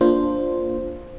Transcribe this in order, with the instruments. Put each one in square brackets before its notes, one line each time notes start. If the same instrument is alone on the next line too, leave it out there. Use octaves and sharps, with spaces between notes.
[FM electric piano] A#3 D4 F4 C5